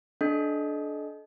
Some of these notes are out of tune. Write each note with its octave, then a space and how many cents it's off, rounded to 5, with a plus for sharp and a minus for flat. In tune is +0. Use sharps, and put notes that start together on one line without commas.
D4 +0 A4 -35 D#5 +0